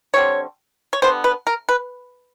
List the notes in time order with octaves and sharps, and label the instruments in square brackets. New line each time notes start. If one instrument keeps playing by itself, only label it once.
[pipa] D3 G3 C4 C#5
C#5
D3 G3 B3 C5
B4
A#4
B4